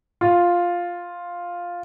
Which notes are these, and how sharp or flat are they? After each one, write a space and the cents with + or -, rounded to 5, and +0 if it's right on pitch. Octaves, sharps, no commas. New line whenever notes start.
F4 +5